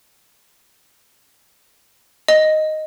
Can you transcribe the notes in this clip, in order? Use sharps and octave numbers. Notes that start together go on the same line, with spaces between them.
D#5